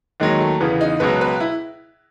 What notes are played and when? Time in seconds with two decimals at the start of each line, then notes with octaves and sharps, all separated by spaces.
0.20 D#2 D#3 F#3 G#3
0.40 A3
0.60 E2 C#3 E3 B3
0.81 D#4
1.00 C#2 B2 F#3 B4
1.21 B4
1.40 E4